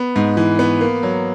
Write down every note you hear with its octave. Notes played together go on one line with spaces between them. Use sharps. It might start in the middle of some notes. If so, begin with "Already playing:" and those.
Already playing: B3
G#2
E3
B3
A#3
F#3